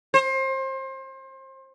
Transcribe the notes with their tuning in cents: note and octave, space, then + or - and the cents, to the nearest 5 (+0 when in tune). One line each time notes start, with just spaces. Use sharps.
C5 +30